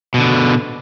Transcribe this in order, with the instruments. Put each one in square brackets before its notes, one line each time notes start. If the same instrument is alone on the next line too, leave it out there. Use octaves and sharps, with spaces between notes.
[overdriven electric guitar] B2 D3